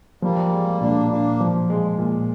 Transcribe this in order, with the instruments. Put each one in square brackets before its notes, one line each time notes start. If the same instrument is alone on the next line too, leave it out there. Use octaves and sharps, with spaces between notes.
[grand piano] F3 [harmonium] G3 A#3
[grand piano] G#3
[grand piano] A#2 [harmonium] A#3 D4
[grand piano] A#2 [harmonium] A#3 D4
[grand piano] F3
G#3
A#2